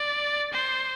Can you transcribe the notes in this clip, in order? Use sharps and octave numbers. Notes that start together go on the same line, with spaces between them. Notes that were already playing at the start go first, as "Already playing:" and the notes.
Already playing: D5
C5